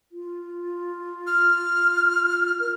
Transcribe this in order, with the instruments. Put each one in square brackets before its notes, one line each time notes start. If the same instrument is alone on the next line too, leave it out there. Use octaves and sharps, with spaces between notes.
[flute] F4
[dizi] F6
[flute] A#4